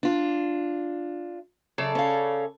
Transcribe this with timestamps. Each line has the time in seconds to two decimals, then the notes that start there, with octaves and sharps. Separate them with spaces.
0.03 D4 F4
1.78 F#2 C#3 A4 D5
1.95 C#4 F5